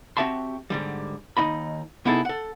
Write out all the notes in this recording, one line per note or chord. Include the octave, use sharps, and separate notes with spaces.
C4 F#4 G4 E5 A5 C6
G#2 D3 G3
D#2 D#4 D#5 B5
C3 B3 D#4 E4 G#4 A4
A4 F#5